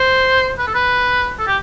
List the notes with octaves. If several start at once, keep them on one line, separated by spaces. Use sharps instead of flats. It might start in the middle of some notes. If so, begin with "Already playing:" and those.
Already playing: C5
B4
A4
B4
A4
G4